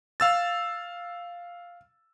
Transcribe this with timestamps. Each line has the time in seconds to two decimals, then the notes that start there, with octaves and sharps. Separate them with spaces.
0.20 F5 E6 A6